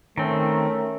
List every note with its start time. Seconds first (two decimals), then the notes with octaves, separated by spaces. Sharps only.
0.17 D#3 A3 C4 C#4 A#4